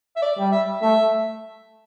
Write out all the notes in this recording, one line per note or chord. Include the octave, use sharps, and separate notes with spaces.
E5
D5
G3
E5
A3 E5